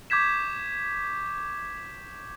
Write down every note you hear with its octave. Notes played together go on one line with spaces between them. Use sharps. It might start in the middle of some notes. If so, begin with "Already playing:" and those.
C#6 D6 G6 G#6 B6 E7